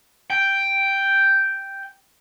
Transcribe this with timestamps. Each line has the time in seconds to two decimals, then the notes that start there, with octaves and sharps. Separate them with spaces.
0.30 G5